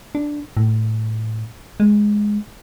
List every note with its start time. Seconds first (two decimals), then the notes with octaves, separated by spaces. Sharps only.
0.15 D4
0.57 A2
1.80 G#3